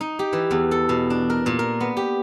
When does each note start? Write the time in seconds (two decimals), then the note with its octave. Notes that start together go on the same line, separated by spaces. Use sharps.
0.01 D#4
0.19 G4
0.33 E3
0.51 E2
0.71 A4
0.89 B2
1.10 D4
1.30 A#4
1.46 A#2
1.59 A#4
1.80 B3
1.97 G4